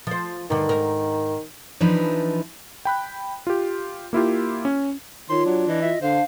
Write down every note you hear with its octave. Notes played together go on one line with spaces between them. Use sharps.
F3 C5
G2 D3 D#3
G#2 A#4
E3 F3 D4 D#4 B4
G5 B5 F#6
F4 G4
A#3 E4 F4 G4
C#4
D#3 F4 C#5 C6
F#3 D4
E3 D#5
F4 E5
D3 D4 C5 F5